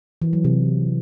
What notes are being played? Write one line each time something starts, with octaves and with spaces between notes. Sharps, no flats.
E3
F#3
C3